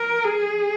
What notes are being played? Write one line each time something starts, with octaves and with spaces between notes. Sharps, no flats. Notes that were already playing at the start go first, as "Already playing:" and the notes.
Already playing: A#4
G#4